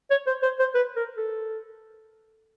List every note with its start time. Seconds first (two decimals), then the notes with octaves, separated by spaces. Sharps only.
0.11 C#5
0.27 C5
0.43 C5
0.59 C5
0.75 B4
0.96 A#4
1.17 A4